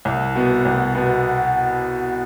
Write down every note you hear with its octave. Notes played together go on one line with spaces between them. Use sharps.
C2
B2 B3
C2
B2 B3